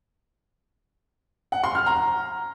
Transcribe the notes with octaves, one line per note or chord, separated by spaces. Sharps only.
F#5
C6
F6
A#5